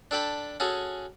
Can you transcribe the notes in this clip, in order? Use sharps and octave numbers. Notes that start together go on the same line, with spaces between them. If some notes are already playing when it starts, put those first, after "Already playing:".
D4 A4 G5 B5
C#4 F#4 G#4 A4